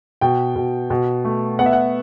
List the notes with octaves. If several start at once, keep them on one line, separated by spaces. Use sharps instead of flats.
B2 G5
B2
B2
A3
B3 F#5
E5
F#5